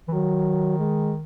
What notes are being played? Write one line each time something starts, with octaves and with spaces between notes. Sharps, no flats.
E3
D#3 F#3
G#3